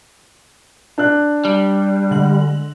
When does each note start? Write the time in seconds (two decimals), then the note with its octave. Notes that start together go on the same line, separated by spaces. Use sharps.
0.98 D4 F#6
1.45 G3
2.11 D3 G#3 F#7